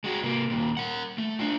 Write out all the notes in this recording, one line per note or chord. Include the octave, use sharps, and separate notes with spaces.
G#3 F#4
C3 A#3
D#2 A#2
A#4 F#5
A3
D4 F4